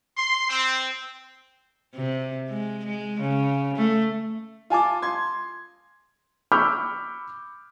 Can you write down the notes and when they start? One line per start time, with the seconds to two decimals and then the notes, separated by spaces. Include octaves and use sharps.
0.18 C6
0.50 C4
1.95 C3
2.49 G#3
2.86 G#3
3.21 C#3
3.77 A3
4.70 F4 G#5 A5 D6
5.02 C6 G#6
6.52 B5 C#6 D6 E6 F6 G6